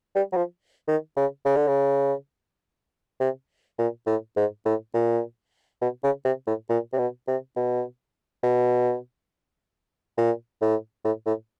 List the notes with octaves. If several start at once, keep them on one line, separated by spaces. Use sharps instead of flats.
G3
F#3
F3
D#3
C#3
C#3
D3
C#3
C3
A#2
A2
G#2
A2
A#2
B2
C#3
C3
A2
A#2
C3
B2
C3
B2
B2
A#2
A2
A2
A2